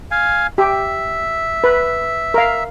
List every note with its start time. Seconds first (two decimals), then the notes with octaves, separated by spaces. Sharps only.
0.11 F5 G#5
0.58 G4 E5
1.64 B4
2.34 A#4 F5